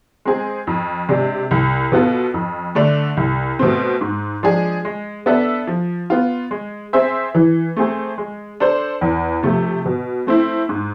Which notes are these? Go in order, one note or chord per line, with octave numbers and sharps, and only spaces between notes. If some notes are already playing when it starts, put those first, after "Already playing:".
G#3 C4 G#4
F2
C3 G#3 D4
C2
B2 B3 F4 A4
F2
D3 A3 D4 A4
C2
B2 A3 C4
G#2
F3 G#3 D4 G#4
G#3
B3 D4 A4 E5
F3
B3 F4
G#3
C4 G#4 C5 E5
E3
A3 C4 G#4
G#3
D4 A4 C5
E2
C3 F3 A3
B2
A3 C4 E4
G#2